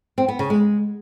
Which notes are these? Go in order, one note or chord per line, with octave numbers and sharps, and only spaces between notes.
C4
B3
C#3
G#3